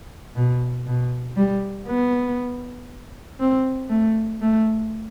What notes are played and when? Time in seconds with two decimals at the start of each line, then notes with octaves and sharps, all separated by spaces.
0.36 B2
0.87 B2
1.37 G3
1.88 B3
3.40 C4
3.90 A3
4.42 A3